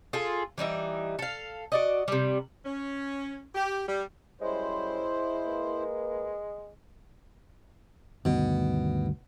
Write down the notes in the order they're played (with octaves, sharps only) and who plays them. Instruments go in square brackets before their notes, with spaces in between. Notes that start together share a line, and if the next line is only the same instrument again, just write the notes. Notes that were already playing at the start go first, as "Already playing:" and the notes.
[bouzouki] F4 G#4 A4
E3 G3 D#4 E5
A4 F5
F#4 D5 D#5
C3 G3
[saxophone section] C#4
G4
G3
[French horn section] F#2 G3 C#5 [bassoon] G#3 [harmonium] E4 C5
[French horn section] A#3 B4
[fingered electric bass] D2 G2 D#3 [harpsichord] B2